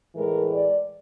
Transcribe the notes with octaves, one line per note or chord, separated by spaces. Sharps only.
A2 E3 G#3 A#4
D5